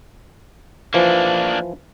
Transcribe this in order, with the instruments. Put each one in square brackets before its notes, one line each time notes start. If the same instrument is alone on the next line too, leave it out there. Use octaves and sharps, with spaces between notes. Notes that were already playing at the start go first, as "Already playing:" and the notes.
[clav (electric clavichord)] E3 F3 [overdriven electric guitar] A#3 D4